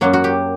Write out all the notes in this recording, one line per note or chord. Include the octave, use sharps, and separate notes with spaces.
F#2 F#3 A#3 F#4
F#4
G4